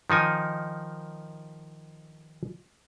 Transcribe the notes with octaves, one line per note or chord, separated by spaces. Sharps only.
D#3 F3 D#4 G#5